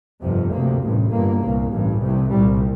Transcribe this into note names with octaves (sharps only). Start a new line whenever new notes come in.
G1 F2 C3
D2 C3 A#3
A1 G2
G1 G2 A#3
C2 A#2
A1 G2
C2 C3
C2 A#2 G3